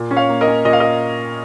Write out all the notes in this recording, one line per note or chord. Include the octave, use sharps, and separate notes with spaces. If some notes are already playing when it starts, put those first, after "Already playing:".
Already playing: A#2
C#4
C#5 F5
A#3
A#4 D#5
C#4
A#2 D#5
F5
A#4 D#5